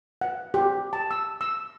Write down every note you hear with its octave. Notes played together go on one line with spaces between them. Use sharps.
F#5
G4
A5
E6
E6